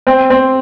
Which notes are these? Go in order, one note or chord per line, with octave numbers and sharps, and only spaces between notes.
C4
C4